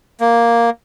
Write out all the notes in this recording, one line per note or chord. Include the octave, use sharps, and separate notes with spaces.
A#3